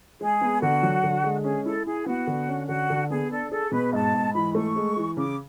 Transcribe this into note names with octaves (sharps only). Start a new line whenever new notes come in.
G#3 G#4
B3
D3 F#4
F#3
D3
G#3
C#4 G#4
E4 A4
E4 G#4
B3 F#4
D3
C#4
D3 F#4
D3
B3 G#4
D4 A4
G#4 A4
B2 B4
G#2 A5
G#2
E3 B5
A3 C#6
G#3
E3
C#3 D6